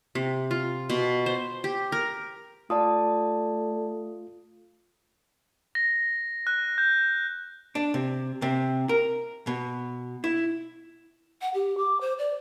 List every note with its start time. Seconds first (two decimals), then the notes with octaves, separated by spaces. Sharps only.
0.15 C3
0.51 F4
0.90 B2
1.26 C5
1.64 G4
1.92 A#4
2.70 A3 F4 D5 A5 D#6
5.75 A#6
6.47 F#6
6.78 G6
7.75 D4
7.94 C3
8.42 C3
8.89 A#4
9.47 B2
10.24 E4
11.41 F#5
11.54 G4
11.78 D6
12.01 C5
12.19 D5